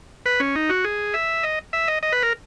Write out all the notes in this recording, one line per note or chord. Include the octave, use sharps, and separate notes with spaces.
B4
C#4
D#4
F#4
G#4
E5
D#5
E5
D#5
D#5
B4
A#4